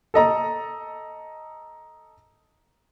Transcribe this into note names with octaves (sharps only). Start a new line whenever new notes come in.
A4 D#5 A#5